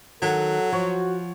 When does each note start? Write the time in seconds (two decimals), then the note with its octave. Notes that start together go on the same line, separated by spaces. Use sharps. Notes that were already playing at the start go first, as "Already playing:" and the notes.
0.22 D#3 F#3 A4 F#5
0.72 F3 F#4 C#5